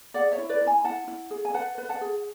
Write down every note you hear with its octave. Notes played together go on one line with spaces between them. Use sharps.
G#4 D5 F#5
C#5 E5
E4
B4 D5
E4
G#5 B5
E4 F#5 A5
E4
G#4
G#5
B4 F#5 A5
B4
F#5 A5
G#4